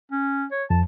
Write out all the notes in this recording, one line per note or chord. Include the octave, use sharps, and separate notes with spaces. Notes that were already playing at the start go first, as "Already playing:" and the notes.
C#4
C#5
F2 A5